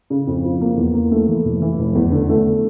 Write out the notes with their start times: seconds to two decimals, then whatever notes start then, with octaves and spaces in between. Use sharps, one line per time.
0.10 C#3
0.27 F2
0.44 F3
0.61 A#3
0.77 E2
0.94 A#3
1.12 A3
1.28 E3
1.45 F1
1.62 E3
1.78 F1
1.95 E2
2.12 D3
2.29 A3